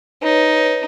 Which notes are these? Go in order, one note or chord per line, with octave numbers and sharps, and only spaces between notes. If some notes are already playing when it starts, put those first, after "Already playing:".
D#4 B4 C#5